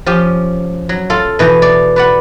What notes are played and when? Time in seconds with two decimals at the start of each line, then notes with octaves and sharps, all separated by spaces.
0.06 F3 C#4 G4
0.89 F#3
1.10 F4 A4 F5
1.39 B2 E3 G5
1.62 D5
1.96 B4 D5 F#5